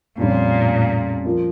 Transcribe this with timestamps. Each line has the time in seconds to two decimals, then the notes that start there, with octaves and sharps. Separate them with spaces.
0.18 F2 A#2 C#3 G3 C#4
1.25 F3 A#3 F4